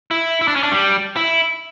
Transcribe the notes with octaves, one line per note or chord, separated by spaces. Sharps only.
E4
E4
D4
C#4
D4
G3
E4